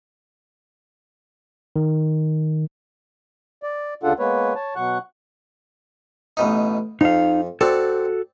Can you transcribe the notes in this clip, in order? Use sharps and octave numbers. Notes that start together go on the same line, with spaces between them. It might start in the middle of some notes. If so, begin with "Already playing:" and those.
D#3
D5
D2 C#3 D4 F4 A4 F#5
G#3 A#3 B3 B4 C#5
C#5 A5
B2 F#3 F#5 C#6 F#6
A1 B2 D#4
F2 D#4 F5
C4 F#4 A4 D5